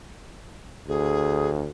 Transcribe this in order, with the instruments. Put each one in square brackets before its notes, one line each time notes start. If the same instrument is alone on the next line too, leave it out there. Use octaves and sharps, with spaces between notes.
[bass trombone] D2 [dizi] G#4